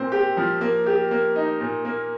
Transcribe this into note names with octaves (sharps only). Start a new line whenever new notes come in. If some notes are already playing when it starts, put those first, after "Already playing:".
Already playing: A#2 C4
G4
F3
A#3
G4
A#3
D#4
A#2
A#3